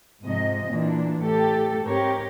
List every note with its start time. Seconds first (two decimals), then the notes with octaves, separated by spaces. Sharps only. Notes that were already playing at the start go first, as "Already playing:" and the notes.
0.23 G#2 C3 F3 D#5
0.71 A#2 E3 D4
1.23 A2 G4 A4
1.83 G#2 C4 G4 A#4 C#5